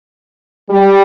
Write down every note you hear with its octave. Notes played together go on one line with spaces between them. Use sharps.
G3